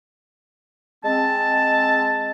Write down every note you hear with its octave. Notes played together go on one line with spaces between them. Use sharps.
G#3 C4 A5